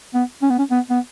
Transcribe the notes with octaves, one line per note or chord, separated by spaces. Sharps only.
B3
C#4
B3
C#4
B3
B3